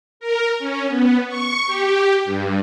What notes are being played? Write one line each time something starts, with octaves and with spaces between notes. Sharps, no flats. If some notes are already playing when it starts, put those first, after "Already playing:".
A#4
C#4
B3
C#6
G4
G2